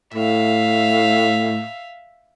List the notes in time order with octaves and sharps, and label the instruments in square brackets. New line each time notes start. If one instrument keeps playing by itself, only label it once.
[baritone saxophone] A2 [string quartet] E5 F5